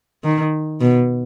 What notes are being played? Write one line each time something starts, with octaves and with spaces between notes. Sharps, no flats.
D#3
B2